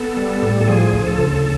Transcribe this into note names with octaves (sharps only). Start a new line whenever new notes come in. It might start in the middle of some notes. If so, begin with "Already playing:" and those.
Already playing: B3 A4
G3
A2
A4
F3 G#4
D2
A4
C#3